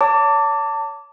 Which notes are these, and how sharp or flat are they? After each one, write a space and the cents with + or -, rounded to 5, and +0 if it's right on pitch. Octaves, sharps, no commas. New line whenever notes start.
C#5 +30 A5 +25 D6 -15